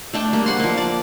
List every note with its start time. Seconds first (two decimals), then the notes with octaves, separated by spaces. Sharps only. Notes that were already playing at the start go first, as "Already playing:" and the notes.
0.14 A3 D4 G5
0.33 G3 A#3
0.46 C5 F#5 C6
0.60 F3 A#3
0.77 D5